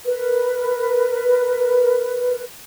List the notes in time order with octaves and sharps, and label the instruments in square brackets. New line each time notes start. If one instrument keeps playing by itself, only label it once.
[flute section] A#4 B4